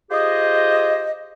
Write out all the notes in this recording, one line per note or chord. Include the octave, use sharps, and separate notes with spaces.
F4 G4 G#4 C5 D#5